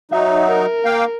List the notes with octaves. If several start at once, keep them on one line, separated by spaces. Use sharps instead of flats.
F#3 D#4 E5
A#4
A#3 F5 G5